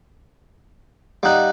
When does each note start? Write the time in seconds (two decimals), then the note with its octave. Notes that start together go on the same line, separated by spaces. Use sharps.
1.23 G3 D#4 F5 F#5 F#6